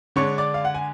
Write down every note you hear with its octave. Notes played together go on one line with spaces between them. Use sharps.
D3 G#3 D4 C#5 C#6
D5 D6
F5
F#5
G#5